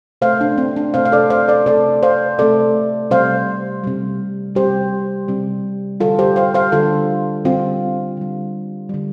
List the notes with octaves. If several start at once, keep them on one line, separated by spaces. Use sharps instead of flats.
C3 A3 C5 F5
D4
C4
D4
C3 A3 C5 F5
F5
A4 D5
C5 F5
A4 D5
C3 A3 A4 D5
C5 F5
C3 A3 A4 D5
C3 G3 C5 F5
C3 G3
C3 G3 G4 C5
C3 G3
D3 G3 F4 A4
G4 C5
C5 F5
C5 F5
D3 G3 F4 A4
D3 G3 C4 F4
D3 G3
D3 G3